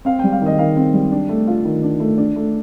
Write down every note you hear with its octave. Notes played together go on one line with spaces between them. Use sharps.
C4 F5
G3 G5
F5
D#3 D#5
D#3 F5
C4
G3
D4
A3
F4
D#3
D4
A3
D4
A3